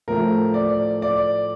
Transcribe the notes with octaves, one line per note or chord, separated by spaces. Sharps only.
A2 F3 A3 A#4
D5
D5